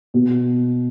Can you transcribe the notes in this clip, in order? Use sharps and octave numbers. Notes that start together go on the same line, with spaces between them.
B2